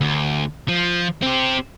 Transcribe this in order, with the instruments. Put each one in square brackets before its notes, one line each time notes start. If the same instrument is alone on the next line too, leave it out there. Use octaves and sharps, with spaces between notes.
[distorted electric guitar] D2
F3
C4 G4